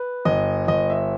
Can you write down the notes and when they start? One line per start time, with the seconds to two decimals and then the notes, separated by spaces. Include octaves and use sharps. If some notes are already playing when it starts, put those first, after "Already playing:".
Already playing: B4
0.25 G1 D#5
0.68 G1 D#5
0.90 E5